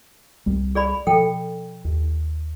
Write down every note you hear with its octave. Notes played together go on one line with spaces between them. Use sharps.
C2 G3
G#4 D5 B5
B2 F3 A4 G5
D#2